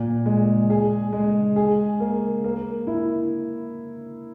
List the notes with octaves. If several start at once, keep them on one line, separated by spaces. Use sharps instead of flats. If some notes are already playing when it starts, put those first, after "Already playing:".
Already playing: A#2
G#3
G#4
G#3
G#4
A#3
A#3
E4